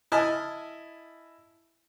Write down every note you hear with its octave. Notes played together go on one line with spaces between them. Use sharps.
E4 D#5 G#5 A5 F6